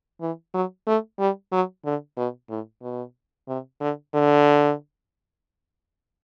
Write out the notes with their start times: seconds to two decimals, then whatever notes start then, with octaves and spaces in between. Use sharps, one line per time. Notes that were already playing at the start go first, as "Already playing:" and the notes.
0.21 E3
0.54 F#3
0.87 A3
1.19 G3
1.52 F#3
1.85 D3
2.17 B2
2.50 A2
2.82 B2
3.48 C3
3.81 D3
4.14 D3